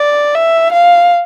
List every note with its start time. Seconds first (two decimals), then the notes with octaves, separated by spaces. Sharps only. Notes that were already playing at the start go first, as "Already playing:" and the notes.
Already playing: D5
0.35 E5
0.73 F5